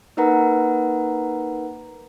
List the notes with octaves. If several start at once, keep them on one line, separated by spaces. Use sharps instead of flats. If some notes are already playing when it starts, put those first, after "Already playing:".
A#3 D#4 A#4 B4 F#5 A#5